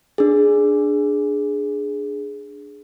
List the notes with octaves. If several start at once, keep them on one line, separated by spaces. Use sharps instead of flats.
D4 G#4